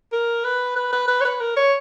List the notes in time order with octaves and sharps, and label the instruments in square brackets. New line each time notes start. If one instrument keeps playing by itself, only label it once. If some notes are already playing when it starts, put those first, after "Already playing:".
[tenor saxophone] A#4
B4
B4
B4
B4
C#5
B4
A#4
C#5